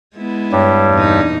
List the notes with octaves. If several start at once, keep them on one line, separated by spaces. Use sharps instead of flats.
G#3 B3 E4
G2 G3 C#5
E2 A#2 D#4